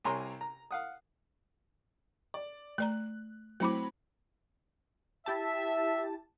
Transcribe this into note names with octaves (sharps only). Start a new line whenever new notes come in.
C2 C3 C#5 G#5 A#5 C6
A#5
F5 F#5 D#6
D5
A3 D5 A#5 F#6
F#3 A3 C4 E4 B5 D6
E4 G4 E5 A5